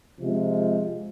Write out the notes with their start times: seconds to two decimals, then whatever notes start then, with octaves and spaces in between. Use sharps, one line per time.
0.19 C3 F3 G#3